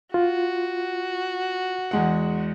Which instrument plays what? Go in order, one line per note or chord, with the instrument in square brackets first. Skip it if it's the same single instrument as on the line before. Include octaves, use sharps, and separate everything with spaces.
[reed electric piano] F4 [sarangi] F#4
[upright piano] E2 G#3 F#5